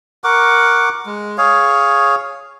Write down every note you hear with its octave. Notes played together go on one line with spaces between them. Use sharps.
A#4 F#5 C#6 D6
G#3
G#4 C#5 F5